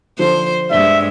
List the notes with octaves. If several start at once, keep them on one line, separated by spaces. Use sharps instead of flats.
D3 F3 C5
G2 G#3 D4 E5 G7